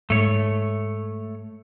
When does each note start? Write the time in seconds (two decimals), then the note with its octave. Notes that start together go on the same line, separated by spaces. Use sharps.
0.10 G#2 A3 C#5